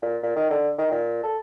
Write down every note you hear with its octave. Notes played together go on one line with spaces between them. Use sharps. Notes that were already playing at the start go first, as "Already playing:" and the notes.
A#2
A#2
D#3
D3
D#3
A#2
A4